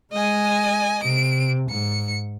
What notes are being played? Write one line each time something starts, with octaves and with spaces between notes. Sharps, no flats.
G#3 D#5 G#5
C3 D7
G#2 C#7